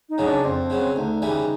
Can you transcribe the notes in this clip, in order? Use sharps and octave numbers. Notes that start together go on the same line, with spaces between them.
D#4
C#3 F#3
D4
F2 C4
C#3 F#3
D2 D#4
C#3 E3 G3